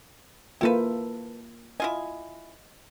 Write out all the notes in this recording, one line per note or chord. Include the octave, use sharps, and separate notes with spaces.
A#3 E4 F4 A4 B4 G5
E4 F4 D#5 G#5